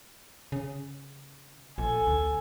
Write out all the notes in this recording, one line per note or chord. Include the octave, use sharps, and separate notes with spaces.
C#3
A#1 A4 G#5
D2